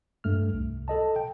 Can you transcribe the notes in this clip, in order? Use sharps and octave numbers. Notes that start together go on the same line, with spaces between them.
G2 A3 F6
C2
A4 D#5 A5
G5